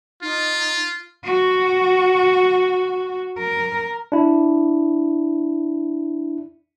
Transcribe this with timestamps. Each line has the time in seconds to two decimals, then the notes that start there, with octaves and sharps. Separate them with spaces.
0.22 D#4 F4
1.25 F#4
3.38 A#4
4.12 D4 E4